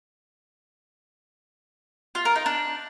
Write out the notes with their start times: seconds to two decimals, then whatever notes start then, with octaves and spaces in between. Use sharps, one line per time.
2.15 F4
2.25 A#4
2.35 D#4
2.46 D4